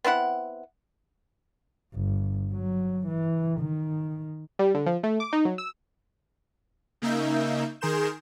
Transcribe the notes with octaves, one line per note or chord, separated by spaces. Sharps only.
B3 C4 E4 F#5
G1
F#3
E3
D#3
G3
D3
F3
A3
D6
D#4
F#3
E6
C#3 A#3 D#4 E5 G6
D#3 G#4 A#4 C6 G6 E7